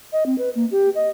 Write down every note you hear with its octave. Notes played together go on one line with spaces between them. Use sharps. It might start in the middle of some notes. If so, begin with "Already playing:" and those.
D#5
C4
B4
A#3
G4
D#5